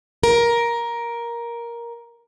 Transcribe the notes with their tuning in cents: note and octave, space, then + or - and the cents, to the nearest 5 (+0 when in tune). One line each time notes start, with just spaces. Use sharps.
A#4 +10